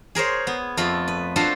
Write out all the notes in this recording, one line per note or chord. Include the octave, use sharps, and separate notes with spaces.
G#4 A#4 C5 C#5
B3
F2 A3 F4 B5
B4
D4 F4 F#4 A4 C5 F5